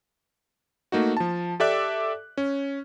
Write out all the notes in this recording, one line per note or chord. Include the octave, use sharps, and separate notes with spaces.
A3 A#3 D#4 F#4
F3 A5
G4 A4 D5 E5 D6 F#6
C#4